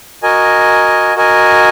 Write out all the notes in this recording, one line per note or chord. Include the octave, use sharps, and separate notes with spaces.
F#4 A#4 D#5 G#5
F#4 A#4 D#5 G#5